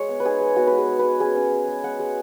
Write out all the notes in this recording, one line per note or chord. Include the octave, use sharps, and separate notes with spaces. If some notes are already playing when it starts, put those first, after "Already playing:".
Already playing: G#3 C#5
B3
B4
D#4 G#4
G#3
B3 F#4
G#3 B4
G#4
G#3
B4
G#3
C#4 G#4
C#4
G#3
G#3
G#3 F#5
G#3